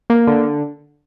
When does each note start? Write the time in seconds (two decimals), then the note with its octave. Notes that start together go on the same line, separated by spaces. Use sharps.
0.10 A#3
0.27 D3